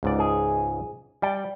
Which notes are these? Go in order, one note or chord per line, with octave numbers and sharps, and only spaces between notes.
C#2 G#2 D5
G#4
G3 D5 G5